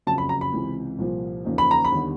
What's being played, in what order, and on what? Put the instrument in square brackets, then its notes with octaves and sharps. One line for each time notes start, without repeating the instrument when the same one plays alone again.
[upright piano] F#1 F2 C#3 F#3 [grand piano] A5
[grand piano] B5
A#5
B5
[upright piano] C#2 C3 E3
C2 A#2 F3
E2 C#3 F3 A#3 D#4
[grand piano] B5
A#5
B5
[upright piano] D#2 D3 G3 B3 D#4